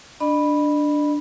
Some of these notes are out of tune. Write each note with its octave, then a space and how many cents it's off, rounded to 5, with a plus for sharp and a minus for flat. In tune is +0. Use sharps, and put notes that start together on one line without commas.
D4 +0 D#5 -45 B5 -5